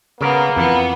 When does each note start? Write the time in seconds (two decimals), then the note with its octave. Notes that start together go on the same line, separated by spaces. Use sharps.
0.21 C#3 A#3 B3 A#4 F5
0.56 F2 E3 B3